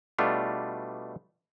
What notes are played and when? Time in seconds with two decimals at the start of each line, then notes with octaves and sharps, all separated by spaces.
0.18 B2 G3 A3 D4 F4